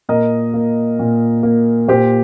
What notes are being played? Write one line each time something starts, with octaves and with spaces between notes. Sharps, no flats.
A#2 A#4 D#5
A#3
A#2
A#3
A#2 G4 C5